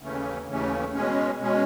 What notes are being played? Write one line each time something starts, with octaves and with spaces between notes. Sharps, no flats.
D#2 C#3 E3 A3 C#4
D#2 C#3 E3 A3 C#4
B2 G#3 C#4
B2 G#3 C#4